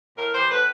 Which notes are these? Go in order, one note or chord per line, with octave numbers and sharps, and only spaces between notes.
A2 A#4
E3 G3 C5
A2 B4